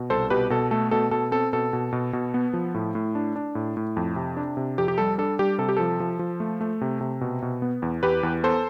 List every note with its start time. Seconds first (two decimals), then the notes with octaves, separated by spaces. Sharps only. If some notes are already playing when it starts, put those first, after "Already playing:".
Already playing: B2
0.10 C2 A4 C5
0.30 B2 G4 B4
0.50 B2 A4
0.71 A3 A4
0.91 B2 A4
1.11 B2 A4
1.32 C4 A4
1.53 B2 A4
1.73 B2
1.93 B2
2.13 B2
2.34 B3
2.53 F3
2.74 A2
2.95 A2
3.15 D4
3.36 D4
3.55 A2
3.77 A2
3.97 F2
4.16 C3
4.37 D4
4.57 C3
4.78 F2 G4
4.88 G4
4.98 G3 A4
5.18 D4 A4
5.39 G3 G4
5.58 C3 A4
5.69 G4
5.77 F3 A4
6.00 F3
6.19 F3
6.40 A3
6.61 A3
6.81 C3
7.01 C3
7.21 B2
7.42 B2
7.62 B3
7.82 E2
8.03 E2 G4 B4
8.23 E2
8.43 B3 A4 C5